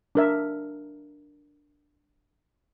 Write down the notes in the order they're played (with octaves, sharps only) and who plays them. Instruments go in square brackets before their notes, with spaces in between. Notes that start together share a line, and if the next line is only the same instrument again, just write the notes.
[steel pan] D4 A#4 E5